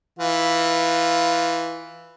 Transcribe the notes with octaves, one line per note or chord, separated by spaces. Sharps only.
E3 F4